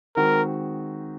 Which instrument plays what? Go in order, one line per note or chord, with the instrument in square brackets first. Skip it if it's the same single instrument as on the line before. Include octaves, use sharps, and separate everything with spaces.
[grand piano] D#3 G#3 C4 F#4 [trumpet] A#4